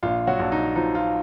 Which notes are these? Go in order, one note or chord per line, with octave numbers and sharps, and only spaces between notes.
A#1 F4
F#3 F#4
A#1
D#4
F3 D#4
F4